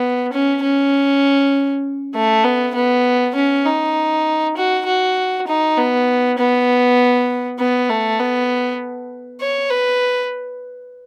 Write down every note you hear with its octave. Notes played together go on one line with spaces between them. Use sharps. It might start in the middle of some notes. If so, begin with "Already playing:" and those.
Already playing: B3
C#4
C#4
A3
B3
B3
C#4
D#4
F#4
F#4
D#4
B3
B3
B3
A3
B3
C#5
B4